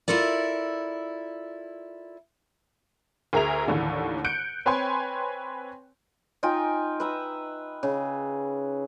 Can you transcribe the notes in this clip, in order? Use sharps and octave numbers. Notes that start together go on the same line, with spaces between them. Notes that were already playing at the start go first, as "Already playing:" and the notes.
E4 F4 A4 A#4 D5
D2 G#4 A#4 E5 F7
D#2 A2 D3 E3
F#6 G6 C#7 D7
C4 B4 C#5 G5 G#5 C6
D#4 F4 G5 G#5
B4 E5 A#5
C#3